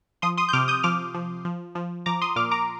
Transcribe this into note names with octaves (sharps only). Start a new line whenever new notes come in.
F3 C6 D#6
C6 D#6
G6
C3 D6 F6
D#6 G6
F3 D6 F6
F3
F3
F3
F3 A#5 D6
C6 D#6
A#2 D6 F6
A#5 D6